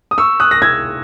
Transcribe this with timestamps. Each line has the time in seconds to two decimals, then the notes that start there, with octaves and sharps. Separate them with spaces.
0.11 D#6
0.18 C#6 E6
0.40 D#6 F#6
0.51 A#6
0.62 E6 G#6